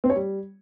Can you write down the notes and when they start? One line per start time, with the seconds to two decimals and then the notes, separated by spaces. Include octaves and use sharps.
0.04 C4
0.10 C#5
0.16 G3